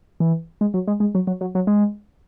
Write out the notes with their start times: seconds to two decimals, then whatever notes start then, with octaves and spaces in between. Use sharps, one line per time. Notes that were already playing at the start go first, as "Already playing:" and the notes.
0.20 E3
0.61 G#3
0.74 F#3
0.87 G#3
1.00 G#3
1.15 F#3
1.27 F#3
1.41 F#3
1.55 F#3
1.67 G#3